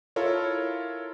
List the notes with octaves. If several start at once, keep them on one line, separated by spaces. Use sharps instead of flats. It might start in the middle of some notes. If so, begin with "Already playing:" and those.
E4 F4 A4 A#4 C#5